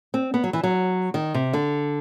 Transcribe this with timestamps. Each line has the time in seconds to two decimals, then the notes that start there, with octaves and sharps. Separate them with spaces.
0.14 C4
0.34 B3
0.44 F#3
0.53 E3
0.63 F#3
1.14 D#3
1.34 C3
1.53 D3